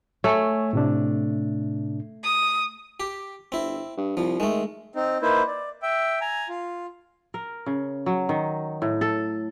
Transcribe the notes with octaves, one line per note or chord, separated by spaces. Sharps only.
A3 C#5 G#5
A2 C3 D4
D#6
G4
G1 C4 E4
G2
C2 F3
D#3 G#3 A3
C4 D#4
A#3 D#4 E4 B4 C5
D5
E5 G5
G#5 A#5
F4
A#4
C#3
F#3
D#3
A2
A4